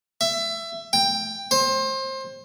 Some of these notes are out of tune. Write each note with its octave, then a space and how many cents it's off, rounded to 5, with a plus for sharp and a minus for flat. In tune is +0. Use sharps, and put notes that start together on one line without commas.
E5 +20
G5 +10
C5 +25